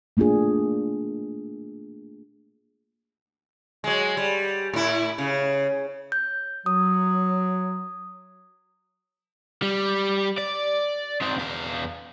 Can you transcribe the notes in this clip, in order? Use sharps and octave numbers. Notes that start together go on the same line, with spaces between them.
A3 A#3 D4 F4 G#4
F#3 G#3
G3
A2 E4
C#3
G6
F#3 D#6
G3
D5
D#3 C4
E2 F5